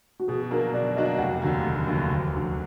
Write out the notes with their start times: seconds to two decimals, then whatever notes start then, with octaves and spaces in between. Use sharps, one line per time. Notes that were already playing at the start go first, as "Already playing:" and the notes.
0.20 F#4
0.28 B2 G#4
0.51 F#3 A#3 D4 F#4 A#4
0.73 B2 D5
0.96 F#3 A#3 D4 F#4 D#5
1.18 F1 F#5
1.42 D#2 D3 F#3 A#3
1.64 F1
1.87 D#2 D3 F#3 A#3
2.10 D2
2.32 D3 F#3